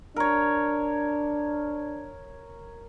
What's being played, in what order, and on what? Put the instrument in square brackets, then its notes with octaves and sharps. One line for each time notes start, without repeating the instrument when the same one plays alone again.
[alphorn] D4 [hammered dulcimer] A#4 C#5